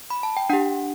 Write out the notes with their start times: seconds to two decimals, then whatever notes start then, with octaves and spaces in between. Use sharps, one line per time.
0.10 B5
0.23 A5
0.37 G5
0.50 D4 G4 F#5